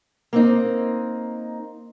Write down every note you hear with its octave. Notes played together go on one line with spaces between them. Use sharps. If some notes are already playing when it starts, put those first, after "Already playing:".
A#3 C4 D#4